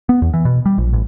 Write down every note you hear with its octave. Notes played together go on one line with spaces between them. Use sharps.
B3
E2
E3
B2
G3
A#1
A1